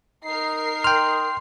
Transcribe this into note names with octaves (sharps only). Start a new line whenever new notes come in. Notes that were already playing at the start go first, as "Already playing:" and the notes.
D#4 A#4 C7
G5 C6 F6